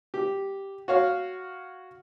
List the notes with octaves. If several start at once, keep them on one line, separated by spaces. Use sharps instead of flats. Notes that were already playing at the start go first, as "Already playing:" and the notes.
G4
F#4 C#5 F5